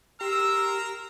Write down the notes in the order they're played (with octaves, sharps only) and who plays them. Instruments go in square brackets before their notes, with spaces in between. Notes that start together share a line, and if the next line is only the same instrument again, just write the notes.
[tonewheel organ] G4 C6 [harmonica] A#4 A#5 [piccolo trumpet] E6